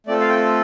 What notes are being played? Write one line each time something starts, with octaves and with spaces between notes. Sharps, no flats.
A3 C4 F4 A4 D5
F5
G5